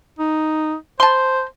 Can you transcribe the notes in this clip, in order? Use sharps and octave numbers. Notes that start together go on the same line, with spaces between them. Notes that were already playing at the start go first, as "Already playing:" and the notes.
D#4
C5 A5 C6